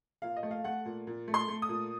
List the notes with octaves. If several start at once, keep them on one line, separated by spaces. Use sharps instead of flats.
A#2 F5
D#5
A3
F5
A3 F#5
A#2
A#2
A3
C6
A3
D#6
A#2